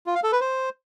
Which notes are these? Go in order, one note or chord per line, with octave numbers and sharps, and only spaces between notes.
F4
F5
A4
B4
C5